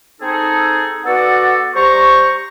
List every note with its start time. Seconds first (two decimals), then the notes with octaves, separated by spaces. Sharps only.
0.21 C4 D#4 G#4 A4
1.05 B3 F#4 A4 D5 F#5
1.75 G3 C5 A#5 C#6